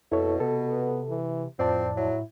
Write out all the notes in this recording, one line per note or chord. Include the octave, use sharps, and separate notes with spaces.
F2 B2 E4 A4 C#5
C3 B3 A4
E3
F2 A2 F3 C4 D5 A5
F#3 E4